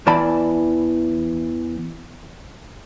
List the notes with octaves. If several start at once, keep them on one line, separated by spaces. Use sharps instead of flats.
E2 E3 D5 A5 B5